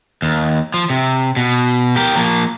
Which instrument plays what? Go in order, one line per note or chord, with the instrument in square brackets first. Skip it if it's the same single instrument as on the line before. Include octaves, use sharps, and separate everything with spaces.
[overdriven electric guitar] D#2
F3
C3
B2
G4 A#4
F3 A#3